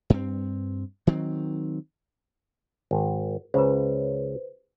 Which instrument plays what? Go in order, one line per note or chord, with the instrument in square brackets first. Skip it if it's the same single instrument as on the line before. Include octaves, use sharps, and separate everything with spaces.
[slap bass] G2 C4
D#3 F#3 C4
[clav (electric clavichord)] G#1
[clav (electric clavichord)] C#2 C#3 [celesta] B4 C5